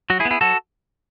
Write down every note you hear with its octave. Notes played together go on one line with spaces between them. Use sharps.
F#3 F#4
E4 G#4
B3
E4 G#4
F#3 F#4 A4